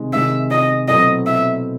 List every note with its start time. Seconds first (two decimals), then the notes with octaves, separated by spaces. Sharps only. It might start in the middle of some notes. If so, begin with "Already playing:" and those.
Already playing: C3 D#3 G#3
0.13 C3 D#3 G#3 E5
0.51 D#5
0.88 B2 F#3 A3 C4 E4 D#5
1.26 E5